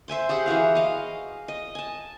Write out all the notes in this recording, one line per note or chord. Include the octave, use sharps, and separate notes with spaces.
C5 E5 G#5 C6
G4 G#4 F#5 C6
E3 F#4 G#4 F5
D#5 F5
D#5
G#5 A5